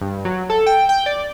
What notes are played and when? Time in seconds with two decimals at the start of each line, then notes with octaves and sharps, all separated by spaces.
0.01 G2
0.25 F#3
0.50 A4
0.66 G5
0.89 G5
1.06 D5